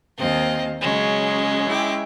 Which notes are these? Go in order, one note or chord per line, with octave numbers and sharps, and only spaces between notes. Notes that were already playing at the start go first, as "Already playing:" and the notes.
D#2 C4 D#5 F5
C#3 F#3 G#3 C#4
E4 G5 D6